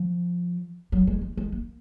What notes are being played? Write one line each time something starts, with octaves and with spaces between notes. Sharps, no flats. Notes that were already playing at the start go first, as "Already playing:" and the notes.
Already playing: F3
F#3
G#3
G#3
G#3
A#3